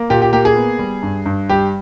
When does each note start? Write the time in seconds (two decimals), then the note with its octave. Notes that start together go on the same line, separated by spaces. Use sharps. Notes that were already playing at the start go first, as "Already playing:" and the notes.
Already playing: A#3
0.10 A#2 G4
0.22 G4
0.33 A#3 G4
0.45 G#4
0.56 B3
0.79 G3
1.03 G2
1.26 G2
1.49 G3 G4